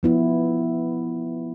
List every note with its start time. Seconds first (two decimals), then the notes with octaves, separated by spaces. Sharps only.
0.03 F3 B3 E4